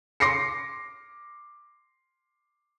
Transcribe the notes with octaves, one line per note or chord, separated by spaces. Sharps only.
C6 D6 A#6 C7 C#7